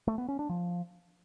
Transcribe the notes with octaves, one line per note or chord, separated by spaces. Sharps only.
A3
B3
C#4
D4
F3